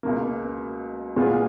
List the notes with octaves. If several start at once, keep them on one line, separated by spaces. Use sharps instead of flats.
C#2 B2 A#3
A#2 G#3 B3 F4 G#4